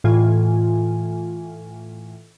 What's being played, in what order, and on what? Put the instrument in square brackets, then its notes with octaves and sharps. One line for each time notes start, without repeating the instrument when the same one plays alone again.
[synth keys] A2 E3 F4 G#5